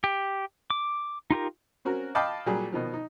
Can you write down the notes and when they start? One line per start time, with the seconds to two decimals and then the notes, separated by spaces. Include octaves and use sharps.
0.04 G4
0.70 D6
1.31 D#4 F4 G4 A#4
1.85 C4 C#4 F#4 A#4
2.15 D#5 F5 G5 A5 B5 D6
2.46 A#2 F#3 G3 G#4
2.72 B2 D#3 F3
2.94 D#4